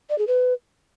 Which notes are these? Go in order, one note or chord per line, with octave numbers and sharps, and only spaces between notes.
D5
G#4
B4